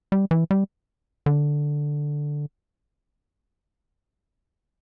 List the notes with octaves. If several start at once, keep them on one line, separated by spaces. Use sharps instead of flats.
G3
E3
G3
D3